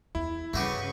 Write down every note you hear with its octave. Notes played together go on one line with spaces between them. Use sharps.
E2 E4
G2 C#3 A3 F#4 G4 B4 C#6